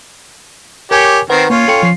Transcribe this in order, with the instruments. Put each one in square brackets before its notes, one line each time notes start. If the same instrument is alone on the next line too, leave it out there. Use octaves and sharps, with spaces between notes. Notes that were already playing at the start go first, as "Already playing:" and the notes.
[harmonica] G4 C#5 [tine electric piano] A#4 G#5
[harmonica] D#3 C4 [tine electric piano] B4 F#5
[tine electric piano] A#3 [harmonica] C#4 F4
[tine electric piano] A4 G5 C#7
F3 C7